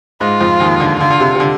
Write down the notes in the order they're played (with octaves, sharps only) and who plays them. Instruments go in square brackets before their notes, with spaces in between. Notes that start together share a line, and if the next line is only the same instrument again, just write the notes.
[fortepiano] G#2 G#3 [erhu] F4
[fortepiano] F2 F3
D#2 D#3
D3
[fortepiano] D3 [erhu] F4
[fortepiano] D3
C3
C3
D3